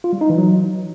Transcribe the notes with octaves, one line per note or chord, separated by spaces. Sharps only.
F4
G3
D#4
E3
F#3